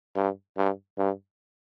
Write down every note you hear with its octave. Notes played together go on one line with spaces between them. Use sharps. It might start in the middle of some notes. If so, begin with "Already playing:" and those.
G2
G2
G2